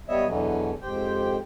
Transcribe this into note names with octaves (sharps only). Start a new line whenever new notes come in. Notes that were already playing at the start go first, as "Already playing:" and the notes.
G3 B3 C#5 D#5 E5
E2 B2 D3 E3 F#3
F2 G#2 G4 C5 G5